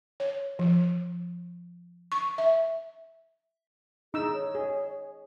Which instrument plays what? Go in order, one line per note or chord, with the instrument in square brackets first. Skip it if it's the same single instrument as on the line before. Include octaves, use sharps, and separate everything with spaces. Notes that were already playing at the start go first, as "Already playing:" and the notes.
[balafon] C#5
F3
C#6
E5
[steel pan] D#4 E6 [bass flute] G#4
[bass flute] C#5
[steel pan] G#4